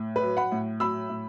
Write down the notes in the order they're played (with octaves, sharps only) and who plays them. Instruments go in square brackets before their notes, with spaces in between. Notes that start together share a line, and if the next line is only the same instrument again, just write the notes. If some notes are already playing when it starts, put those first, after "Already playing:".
Already playing: [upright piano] A2
B4
F#3
F#5 B5
A2
F#3 B5 E6
A2